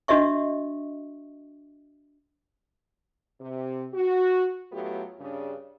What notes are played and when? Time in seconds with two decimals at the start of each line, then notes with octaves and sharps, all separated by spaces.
0.08 D4 F#4 D#5 E5 C#6
3.40 C3
3.93 F#4
4.72 A2 F#3 A3 B3 F4 G4
5.19 G2 C#3 D4